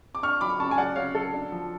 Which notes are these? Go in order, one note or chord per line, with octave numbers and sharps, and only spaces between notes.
D6
D4 C#6 F6
F#3 B5 D6
C#3 A5 C#6
G#5
F#3 D5 F#5
C#3 C#5 F5
F#3 A4
D4
F3